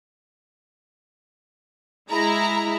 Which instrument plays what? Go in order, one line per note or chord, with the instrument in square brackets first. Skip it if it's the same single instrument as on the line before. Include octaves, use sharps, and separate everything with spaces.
[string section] G#3 E4 [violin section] A#5